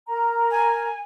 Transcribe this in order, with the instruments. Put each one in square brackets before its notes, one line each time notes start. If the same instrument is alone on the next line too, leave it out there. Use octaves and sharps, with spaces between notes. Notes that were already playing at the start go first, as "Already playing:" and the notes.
[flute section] A#4 A#5
[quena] G#5